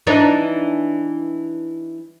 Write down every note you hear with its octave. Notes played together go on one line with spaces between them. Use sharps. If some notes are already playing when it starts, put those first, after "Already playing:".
E3 D4 D#4